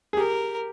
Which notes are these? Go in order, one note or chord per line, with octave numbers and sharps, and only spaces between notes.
G#4
G4 A#4